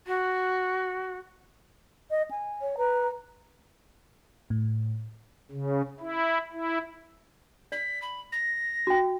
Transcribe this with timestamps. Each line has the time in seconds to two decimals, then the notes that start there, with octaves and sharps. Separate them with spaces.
0.07 F#4
2.11 D#5
2.31 G#5
2.61 C#5
2.78 B4 A#5
4.50 A2
5.51 C#3
6.00 E4
6.53 E4
7.72 D5 B6
8.02 B5
8.32 A#6
8.87 F#4 G5